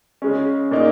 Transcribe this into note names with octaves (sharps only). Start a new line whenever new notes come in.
C#3 G#3 C#4
A#2 A#3 D#4